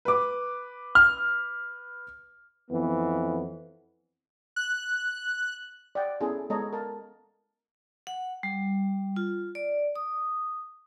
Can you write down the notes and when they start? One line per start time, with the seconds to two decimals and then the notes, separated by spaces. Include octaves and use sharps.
0.05 B4 D6
0.95 F6
2.70 F2 E3 B3
4.56 F#6
5.95 D5 F#5 G5
6.21 B3 C#4 E4 G#4 A4
6.50 G#3 B3 A4 C#5 D#5 A#5
6.73 A#4 A5
8.07 F#5
8.43 G3
9.16 F4
9.55 D5
9.96 D#6